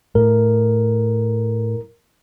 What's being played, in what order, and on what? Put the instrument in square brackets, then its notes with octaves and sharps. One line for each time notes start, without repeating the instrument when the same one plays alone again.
[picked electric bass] A2 [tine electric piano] A#4